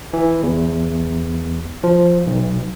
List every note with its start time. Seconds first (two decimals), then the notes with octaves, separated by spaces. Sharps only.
0.13 E3
0.43 E2
1.84 F3
2.27 B1